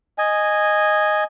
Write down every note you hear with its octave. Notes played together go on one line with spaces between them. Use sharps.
D#5 G#5